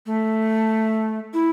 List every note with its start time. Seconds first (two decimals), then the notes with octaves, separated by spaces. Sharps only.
0.06 A3
1.34 E4